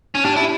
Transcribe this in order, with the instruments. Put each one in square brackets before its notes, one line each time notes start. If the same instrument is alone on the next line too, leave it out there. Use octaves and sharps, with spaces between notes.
[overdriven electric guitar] C#4
[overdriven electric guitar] D4 [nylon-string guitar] G4
[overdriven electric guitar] E4